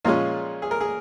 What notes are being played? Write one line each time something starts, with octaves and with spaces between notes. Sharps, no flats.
A#2 F3 G#3 C#4 F4
G#4
A#4
G#4